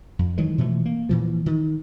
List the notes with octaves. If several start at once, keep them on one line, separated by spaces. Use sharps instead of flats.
F2
D#3 E3 F#3 G#3
B2 E3 F3 A3
A#3
A#2 E3 F3
D#3